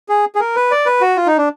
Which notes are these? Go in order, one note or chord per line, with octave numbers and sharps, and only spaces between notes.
G#4
G#4
A#4
B4
D5
B4
F#4
F4
D#4
D4